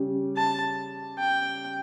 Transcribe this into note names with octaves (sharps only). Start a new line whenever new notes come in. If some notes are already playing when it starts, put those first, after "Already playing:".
Already playing: C#3 G3 C#4 G4
A5
G5